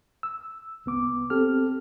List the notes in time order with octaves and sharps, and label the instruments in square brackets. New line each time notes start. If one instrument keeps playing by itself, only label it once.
[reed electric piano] E6
C2 B3 D6
C4 G4 A4 F6